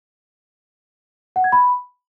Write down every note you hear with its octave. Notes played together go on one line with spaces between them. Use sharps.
F#5
G#6
B5